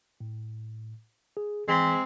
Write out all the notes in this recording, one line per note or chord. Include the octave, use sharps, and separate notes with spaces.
A2
G#4
G#1 E3 G#3 C4 B6